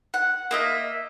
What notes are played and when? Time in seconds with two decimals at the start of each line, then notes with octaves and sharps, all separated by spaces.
0.14 F#5
0.51 A#3 D#5 E5